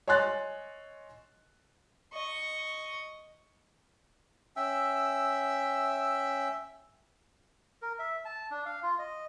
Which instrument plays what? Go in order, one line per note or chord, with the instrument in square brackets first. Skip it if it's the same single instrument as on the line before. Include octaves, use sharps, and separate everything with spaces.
[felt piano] C#5 D#5 G#5 C6 F#6 A6
[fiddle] D#5 C#6
[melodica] C#4 E5 G5 E6
A#4
E5
A5
D4
F5
F4
D#5